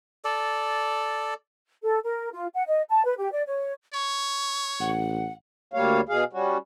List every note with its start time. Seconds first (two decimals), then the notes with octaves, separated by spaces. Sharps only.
0.25 A4 D5
1.84 A4
2.04 A#4
2.33 F4
2.54 F#5
2.67 D#5
2.89 A5
3.05 B4
3.19 G4
3.32 D5
3.47 C#5
3.93 C#5 C#6
4.80 A1 F#5
5.74 D2 G3 A#3 C#5 F5
6.09 B2 G#4 F5
6.33 G3 C#4 F#4